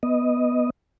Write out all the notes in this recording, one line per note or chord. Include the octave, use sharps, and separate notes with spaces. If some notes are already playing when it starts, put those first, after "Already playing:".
B3 D#5